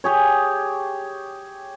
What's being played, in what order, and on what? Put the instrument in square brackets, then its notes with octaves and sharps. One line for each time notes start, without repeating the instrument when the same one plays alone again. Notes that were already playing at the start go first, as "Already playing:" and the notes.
[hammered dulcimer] G4 G#4 C#5